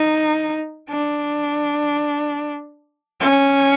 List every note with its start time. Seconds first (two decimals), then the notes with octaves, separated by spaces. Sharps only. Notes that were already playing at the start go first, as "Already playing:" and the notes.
Already playing: D#4
0.89 D4
3.20 C#4